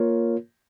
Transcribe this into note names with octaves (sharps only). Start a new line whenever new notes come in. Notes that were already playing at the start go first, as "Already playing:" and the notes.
Already playing: A#3 F4 A#4 C#5